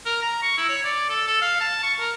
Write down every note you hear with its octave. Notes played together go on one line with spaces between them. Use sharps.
A#4
A#5
C#6
E4
C#5
D5
A4
A4
F5
A5
C#6
A#4